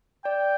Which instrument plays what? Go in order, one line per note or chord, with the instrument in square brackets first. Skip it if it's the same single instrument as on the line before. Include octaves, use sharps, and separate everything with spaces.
[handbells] D5 [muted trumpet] G5